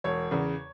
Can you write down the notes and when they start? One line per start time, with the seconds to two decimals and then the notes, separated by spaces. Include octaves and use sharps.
0.04 E1 C#5
0.31 E2 C#3